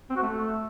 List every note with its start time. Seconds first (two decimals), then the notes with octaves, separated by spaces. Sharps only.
0.10 C4
0.16 F#4
0.22 A3